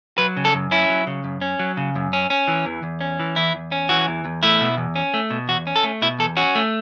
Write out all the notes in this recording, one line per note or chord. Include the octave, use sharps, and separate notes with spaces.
F#3 B4
C#3
A4
F#2
C#4 E4
F#3
C#3
F#2
C#4
F#3
C#3
F#2
C#4
C#4
E3
E2
E2
C#4
E3
E2 E4
E2
C#4
E3 F#4
E2
E2
A3 E4
B2
E2
C#4
A3
B2
E2 F#4
C#4
A4
A3
B2 E4
E2 A4
C#4 F#4
A3